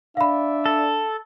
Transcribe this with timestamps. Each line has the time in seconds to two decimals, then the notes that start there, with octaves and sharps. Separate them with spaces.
0.17 D4 D5 E5 F5 B5
0.66 A4